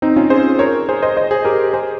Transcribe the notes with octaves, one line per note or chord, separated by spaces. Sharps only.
C4 D#4
C#4 F4
G#4 C5
A#4 C#5
G#4 C5
C5 D#5
C5 D#5
G#4 C5
G4 A#4
G#4 C5